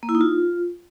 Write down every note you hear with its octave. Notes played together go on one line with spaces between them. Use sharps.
A#3
E4
D#4
F4